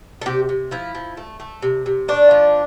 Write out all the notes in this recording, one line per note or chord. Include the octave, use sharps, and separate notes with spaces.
A4
C3 G4
C3
F3 E4
F3
A3
A3
C3
C3
A3 D4
F3